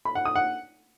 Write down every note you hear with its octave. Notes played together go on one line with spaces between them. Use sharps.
B5
F#5
D#6
F#5